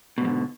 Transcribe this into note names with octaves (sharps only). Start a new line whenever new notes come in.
G#2 B2 D3 G3